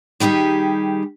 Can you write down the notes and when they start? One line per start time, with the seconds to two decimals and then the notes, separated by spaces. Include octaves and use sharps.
0.20 D#3 G3 D#4 G4 G#4